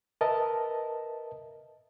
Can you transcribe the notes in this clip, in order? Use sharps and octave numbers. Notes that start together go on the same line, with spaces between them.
A#4 B4 D#5 E5 A5